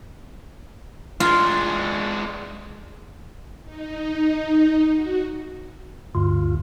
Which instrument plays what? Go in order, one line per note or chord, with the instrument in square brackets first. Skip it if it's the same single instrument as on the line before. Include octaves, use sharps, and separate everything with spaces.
[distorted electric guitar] G#3 D4 [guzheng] F4
[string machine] D#4
F#4
[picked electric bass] D2 [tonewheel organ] G2 F4